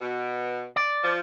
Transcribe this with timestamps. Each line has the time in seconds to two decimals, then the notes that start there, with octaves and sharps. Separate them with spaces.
0.01 B2
0.76 D5
1.04 F3